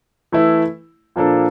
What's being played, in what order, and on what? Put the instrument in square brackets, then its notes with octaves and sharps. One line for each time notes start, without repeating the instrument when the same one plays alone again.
[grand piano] E3 A3 E4
A#2 F3 A#3 D4 A4